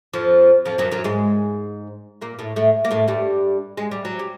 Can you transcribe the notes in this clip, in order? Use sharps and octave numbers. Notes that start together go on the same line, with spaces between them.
F2 F3
F2 F3
F#2 F#3
F#2 F#3
G#2 G#3
A#2 A#3
A2 A3
A2 A3
A#3
A2 A3
G2 G3
G#3
G3
F#3
G3